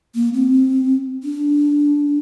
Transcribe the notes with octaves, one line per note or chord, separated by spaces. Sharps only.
A#3
C4
D4